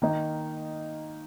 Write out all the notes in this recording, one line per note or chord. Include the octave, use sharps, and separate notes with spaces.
D#3 A#3 D#4